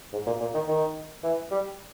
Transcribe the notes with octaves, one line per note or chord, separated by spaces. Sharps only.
G#2
A#2
A#2
D#3
D#3
E3
G3